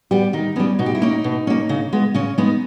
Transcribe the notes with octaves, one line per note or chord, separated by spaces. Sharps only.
G3 B3 G4
D#3 D#4
G3 B3 C#4
B2 D#4
G4
E4
A#3 C#4 D#4
B2
A#3 C#4
C#3
G#3 B3
C#3 C#4
G#3 B3 D#4